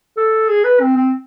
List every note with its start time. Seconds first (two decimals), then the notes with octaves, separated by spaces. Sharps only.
0.17 A4
0.49 G#4
0.65 B4
0.81 C4
0.97 C4